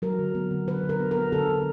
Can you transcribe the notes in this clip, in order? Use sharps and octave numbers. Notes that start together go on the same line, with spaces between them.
F#3 A#4
D3
B3
D3
D3 B4
D3
A#4
B3
A#4
B3
D3 A4
D3